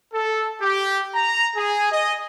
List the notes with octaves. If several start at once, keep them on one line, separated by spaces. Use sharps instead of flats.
A4
G4
A#5
G#4
D#5